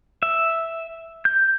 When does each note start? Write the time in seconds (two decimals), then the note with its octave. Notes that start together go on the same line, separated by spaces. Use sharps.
0.23 E5
1.25 G6